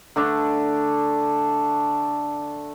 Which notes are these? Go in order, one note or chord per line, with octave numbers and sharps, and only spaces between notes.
D3 A3 D4